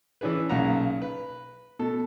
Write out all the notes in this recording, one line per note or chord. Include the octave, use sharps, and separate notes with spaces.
E3 C#4 D4 G#4 B4
B1 A#2 C#3 F#5 A#5
B4
B2 A4